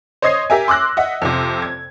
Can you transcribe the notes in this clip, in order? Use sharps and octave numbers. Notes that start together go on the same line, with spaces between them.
C5 C#5 D#5 D#6 G#6 C7
G4 A#4 E5 G#5
C6 D6 E6 F#6 A#6
D#5 E5 F#5
F2 C3
G#6